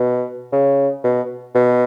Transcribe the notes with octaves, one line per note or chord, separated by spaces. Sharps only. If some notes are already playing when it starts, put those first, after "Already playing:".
Already playing: B2
C#3
B2
B2